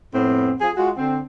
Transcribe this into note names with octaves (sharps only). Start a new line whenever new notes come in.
F2 A2 B3 C4
F3 G#4
G#3 F4 F#4
D3 C4